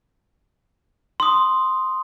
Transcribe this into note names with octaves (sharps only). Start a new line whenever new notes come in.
C6 D#6